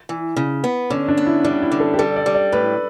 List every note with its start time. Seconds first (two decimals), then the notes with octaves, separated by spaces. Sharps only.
0.09 E3
0.36 C#3
0.64 B3
0.90 D3 C#4
1.08 D4
1.17 B3
1.27 E4
1.44 G3 D4
1.62 E4
1.72 D3
1.80 A4
1.94 G4
1.99 G3 A4
2.16 D5
2.26 G3
2.34 D5
2.52 A2 B4